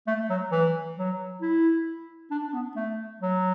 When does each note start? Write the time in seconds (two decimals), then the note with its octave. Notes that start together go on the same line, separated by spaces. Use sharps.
0.07 A3
0.30 F#3
0.51 E3
0.97 F#3
1.42 E4
2.31 D4
2.48 D4
2.54 B3
2.76 A3
3.21 F#3